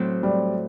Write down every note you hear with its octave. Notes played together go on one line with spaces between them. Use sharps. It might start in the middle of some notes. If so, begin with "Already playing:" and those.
Already playing: A2 F#3 C4
G3